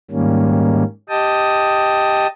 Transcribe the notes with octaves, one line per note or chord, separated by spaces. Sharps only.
G#2 D#3 G3 A#3 C#4
G4 D#5 G5 A5 D#6